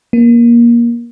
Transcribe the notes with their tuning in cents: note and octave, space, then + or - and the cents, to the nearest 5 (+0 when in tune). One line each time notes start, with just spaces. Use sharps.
A#3 +20